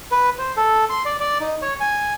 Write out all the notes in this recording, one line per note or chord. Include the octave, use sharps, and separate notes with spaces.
B4
C5
A4
C6
D5
D5
D#4
C#5
G#5